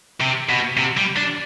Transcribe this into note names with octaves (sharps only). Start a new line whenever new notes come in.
C3
B2
C3
G3
D4